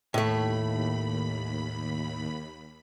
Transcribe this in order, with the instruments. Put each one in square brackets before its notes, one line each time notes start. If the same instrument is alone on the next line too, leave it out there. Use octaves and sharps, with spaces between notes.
[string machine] D#2 B5 [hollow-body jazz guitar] A2 A3